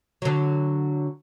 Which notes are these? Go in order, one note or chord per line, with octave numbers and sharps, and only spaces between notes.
D3 F#3